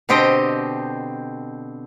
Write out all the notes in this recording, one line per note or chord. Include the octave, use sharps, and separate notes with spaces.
B2 D3 C4 G4 D#5 G5